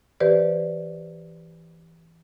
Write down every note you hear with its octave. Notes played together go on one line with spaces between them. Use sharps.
E3 G4 B4 C5 D5